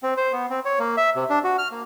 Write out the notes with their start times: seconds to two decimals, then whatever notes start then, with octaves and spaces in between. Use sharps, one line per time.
0.03 C4
0.17 C5
0.32 B3
0.50 C4
0.65 C#5
0.79 A#3
0.97 E5
1.16 C3
1.30 D4
1.44 F#4
1.58 F6
1.71 A#3